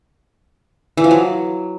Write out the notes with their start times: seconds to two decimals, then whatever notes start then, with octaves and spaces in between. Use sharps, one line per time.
0.97 E3
1.04 F3
1.11 F#3